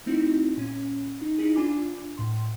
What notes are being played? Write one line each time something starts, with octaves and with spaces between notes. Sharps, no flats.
A3 C4 D#4 E4 F#4
A#2 C#4
D#4
D#4 E4 G#4
D4 F4 G#5 B5 D6
A2 C6